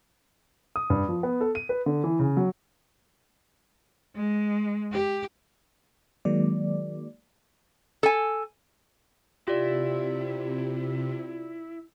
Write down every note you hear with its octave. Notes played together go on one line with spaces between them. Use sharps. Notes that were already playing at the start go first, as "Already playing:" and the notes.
D#6
G2
F3
B3
A4
D#7
B4
D3
E3
C#3
F#3
G#3
G4
D#3 F#3 G#3 A#3 D5
A4 G#5
C3 E4 F4 G4 D5